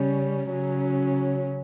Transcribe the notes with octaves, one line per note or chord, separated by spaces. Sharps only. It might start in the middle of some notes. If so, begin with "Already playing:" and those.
Already playing: C#3 G3 C#4
C#3 F#3 C#4